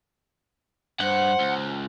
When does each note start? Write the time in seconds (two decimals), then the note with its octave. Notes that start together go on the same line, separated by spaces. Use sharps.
1.00 G2 C5 F#5
1.39 C#2